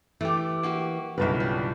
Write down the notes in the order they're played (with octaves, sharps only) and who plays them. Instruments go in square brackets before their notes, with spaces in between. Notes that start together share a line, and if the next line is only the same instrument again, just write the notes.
[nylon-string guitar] E3 [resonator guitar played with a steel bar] A3 G4
[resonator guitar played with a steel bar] A#3 F#4 G4
[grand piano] B1 G2 C#3 [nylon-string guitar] E4 F4 B4
[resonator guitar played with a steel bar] G3